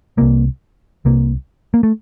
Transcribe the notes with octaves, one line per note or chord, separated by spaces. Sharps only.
C2 C3 A#3
C2 C3 A#3
A#3
A3